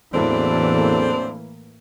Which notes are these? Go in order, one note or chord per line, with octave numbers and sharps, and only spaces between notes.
E2 A2 E3 F#3 A#3 C4 D4 A4